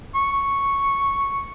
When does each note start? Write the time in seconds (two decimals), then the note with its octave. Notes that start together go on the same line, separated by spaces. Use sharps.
0.15 C#6